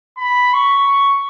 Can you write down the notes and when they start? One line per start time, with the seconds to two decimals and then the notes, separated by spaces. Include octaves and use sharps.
0.18 B5
0.54 C#6